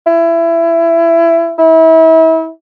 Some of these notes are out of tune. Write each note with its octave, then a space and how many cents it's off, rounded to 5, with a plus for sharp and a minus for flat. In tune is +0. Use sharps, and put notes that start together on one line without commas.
E4 +20
E4 -35